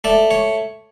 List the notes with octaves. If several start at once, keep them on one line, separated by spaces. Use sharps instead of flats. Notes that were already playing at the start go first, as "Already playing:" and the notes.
A3 D5
C#5